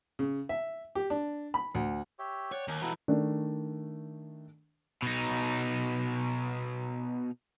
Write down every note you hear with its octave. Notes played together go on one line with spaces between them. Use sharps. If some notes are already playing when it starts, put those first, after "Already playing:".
C#3
E5
G4
D4
B5
D2
G4 C#5 E5
C#5 D5 F#5 G5
D#2 A#4 G#5
E3 D#4 F#4 A4 B4
D#3 A3 D4
B2 D#4